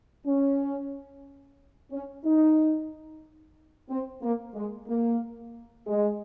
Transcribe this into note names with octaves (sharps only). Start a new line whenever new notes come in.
C#4
C#4
D#4
C4
A#3
G#3
A#3
G#3